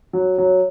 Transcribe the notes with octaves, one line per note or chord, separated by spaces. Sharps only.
F#3
F#3